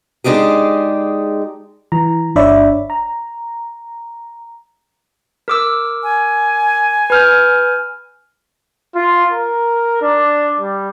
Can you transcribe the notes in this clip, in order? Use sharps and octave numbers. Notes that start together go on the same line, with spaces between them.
G#3 D4 D#4 G4 G#4
E3 A#5
G1 D4 C#5 D5 E5 B5
A#5
A#4 D6 E6
G#5
B4 F6 G6
F4
A#4
D4
G3